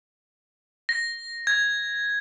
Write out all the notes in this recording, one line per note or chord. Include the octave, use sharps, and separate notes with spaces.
A#6
G#6